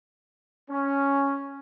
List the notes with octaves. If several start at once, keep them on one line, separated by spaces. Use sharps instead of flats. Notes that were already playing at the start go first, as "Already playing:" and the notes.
C#4